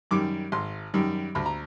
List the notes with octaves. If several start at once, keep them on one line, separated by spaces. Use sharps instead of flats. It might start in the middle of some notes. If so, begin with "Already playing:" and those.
F#2 D#3 G3 D6
G#1 C6
F#2 D#3 G3
D2 B5
A#5